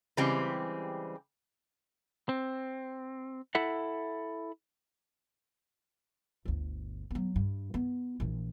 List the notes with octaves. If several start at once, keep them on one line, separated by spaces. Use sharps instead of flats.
C#3 E3 G3 G#3 C4 G4
C4
E4 A4 E5 F#5
G1 D2
F#3 B3
G2
B3
A#1 E3